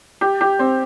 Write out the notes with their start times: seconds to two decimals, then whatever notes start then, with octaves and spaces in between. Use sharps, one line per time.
0.21 G4
0.41 G4
0.59 C4